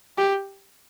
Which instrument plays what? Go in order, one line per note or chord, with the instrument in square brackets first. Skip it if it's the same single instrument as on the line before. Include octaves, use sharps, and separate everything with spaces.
[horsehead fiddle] G4